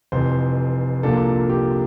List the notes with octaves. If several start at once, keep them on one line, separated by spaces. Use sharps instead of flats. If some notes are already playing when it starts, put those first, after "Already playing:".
F1 F2 E3 C5
C2 A#2 F3 A#3 D4 A4
G4